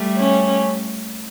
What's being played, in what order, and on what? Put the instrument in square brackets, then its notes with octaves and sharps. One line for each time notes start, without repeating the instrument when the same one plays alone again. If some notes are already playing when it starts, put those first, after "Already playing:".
Already playing: [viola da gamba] G3 A3
[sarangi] C#4